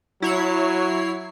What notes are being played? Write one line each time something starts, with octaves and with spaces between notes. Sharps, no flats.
F#3 E4 C#5 C7